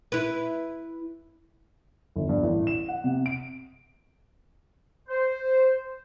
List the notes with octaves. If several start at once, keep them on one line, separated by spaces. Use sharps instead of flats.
E4 B4
G1
G2
A1
E7
F#5
C3
D7
C5